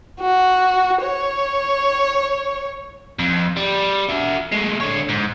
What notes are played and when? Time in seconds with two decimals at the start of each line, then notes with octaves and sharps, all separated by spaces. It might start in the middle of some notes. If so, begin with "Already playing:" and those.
0.21 F#4
1.02 C#5
3.19 F2
3.57 G3
4.09 F#4 E5
4.52 G#3 A3
4.81 D3 C#5
5.10 G#2